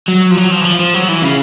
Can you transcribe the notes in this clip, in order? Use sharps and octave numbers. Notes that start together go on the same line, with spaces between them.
F#3
F3
F#3
F3
E3
F3
F3
F#3
E3
C#3